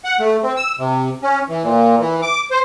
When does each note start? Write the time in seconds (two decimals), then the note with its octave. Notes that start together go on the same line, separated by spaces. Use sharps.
0.04 F#5
0.20 A3
0.43 C4
0.57 E6
0.79 C3
1.23 C#4
1.49 E3
1.64 A#2
2.00 E3
2.22 D6
2.51 C5